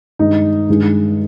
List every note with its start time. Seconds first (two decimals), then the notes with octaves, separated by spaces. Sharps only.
0.19 G2 D#3 G#3 D#4
0.69 G2 D#3 G#3